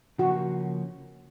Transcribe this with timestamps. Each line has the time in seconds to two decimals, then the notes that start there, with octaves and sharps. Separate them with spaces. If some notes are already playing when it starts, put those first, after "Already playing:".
0.18 C#3 F3 A#3 C#4 F#4